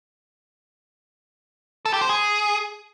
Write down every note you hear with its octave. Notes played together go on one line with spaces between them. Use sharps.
A4
G4
C5
G#4